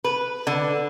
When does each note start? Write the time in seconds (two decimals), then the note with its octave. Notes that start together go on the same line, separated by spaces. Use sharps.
0.04 B4
0.47 D3